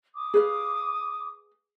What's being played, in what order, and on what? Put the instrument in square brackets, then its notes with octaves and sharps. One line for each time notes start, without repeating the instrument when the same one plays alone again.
[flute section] D6 D#6
[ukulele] G#4 B4 F5